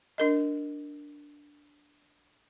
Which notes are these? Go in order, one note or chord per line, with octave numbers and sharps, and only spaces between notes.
D4 A#4 D#5